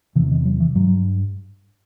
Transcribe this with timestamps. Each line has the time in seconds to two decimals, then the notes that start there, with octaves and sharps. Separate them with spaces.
0.15 E2 C3 E3
0.31 D#3
0.45 F#3
0.60 E3
0.75 G2 F#3